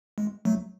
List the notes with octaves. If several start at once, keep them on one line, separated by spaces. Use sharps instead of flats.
G#3
F#3 A3